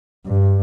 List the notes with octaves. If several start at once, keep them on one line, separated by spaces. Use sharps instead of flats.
G2